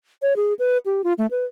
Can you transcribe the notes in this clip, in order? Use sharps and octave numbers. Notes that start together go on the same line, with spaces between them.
C#5
G#4
B4
G4
F4
A3
B4